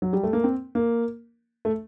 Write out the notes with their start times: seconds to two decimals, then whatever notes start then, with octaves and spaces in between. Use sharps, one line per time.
0.02 F#3
0.13 G3
0.23 A3
0.33 A#3
0.44 C4
0.75 A#3
1.65 A3